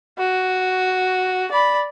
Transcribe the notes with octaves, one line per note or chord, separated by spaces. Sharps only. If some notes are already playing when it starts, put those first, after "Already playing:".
F#4
D5 B5